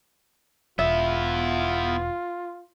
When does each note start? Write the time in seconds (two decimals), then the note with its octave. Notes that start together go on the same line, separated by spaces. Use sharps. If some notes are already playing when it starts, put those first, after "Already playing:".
0.79 E1 B3 E4 F4 E5